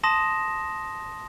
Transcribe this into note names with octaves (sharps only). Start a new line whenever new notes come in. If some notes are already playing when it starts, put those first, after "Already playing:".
A5 C6 D#6 A#6 E7